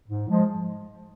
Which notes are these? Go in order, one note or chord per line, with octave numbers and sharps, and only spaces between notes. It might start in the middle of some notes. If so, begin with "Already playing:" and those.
G#2
F3 G#3